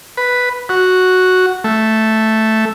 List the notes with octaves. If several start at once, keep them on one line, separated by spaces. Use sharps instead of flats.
B4
F#4
A3